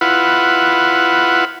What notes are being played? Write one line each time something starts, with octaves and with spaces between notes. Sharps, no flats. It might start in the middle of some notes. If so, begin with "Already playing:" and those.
E4 F4 B4 F#5